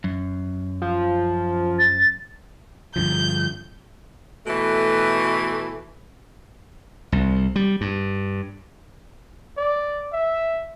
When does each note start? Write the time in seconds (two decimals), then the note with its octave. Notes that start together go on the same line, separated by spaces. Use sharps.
0.04 F#2
0.82 F3
1.79 A6
2.96 G2 D3 F3 G6
4.47 B2 E3 A3
7.12 C2
7.56 G3
7.81 G2
9.58 D5
10.13 E5